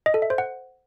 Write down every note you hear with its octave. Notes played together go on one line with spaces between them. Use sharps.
D#5
A4
E5
C5
F#5